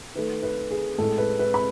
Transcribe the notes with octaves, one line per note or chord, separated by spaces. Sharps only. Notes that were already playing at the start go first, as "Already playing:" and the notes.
D#3 A3 B4
B4
G#4
A2 G#3 A4
B4
B4
B5